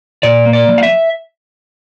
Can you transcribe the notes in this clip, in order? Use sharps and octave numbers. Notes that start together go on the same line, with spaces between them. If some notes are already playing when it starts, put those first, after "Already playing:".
A#2 D5
A#3
D5
F3
F5
E5